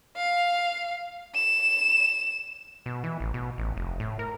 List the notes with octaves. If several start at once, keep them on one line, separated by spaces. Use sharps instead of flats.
F5
E7
B2
E3
A1
B2
A1
F1
A2
A#4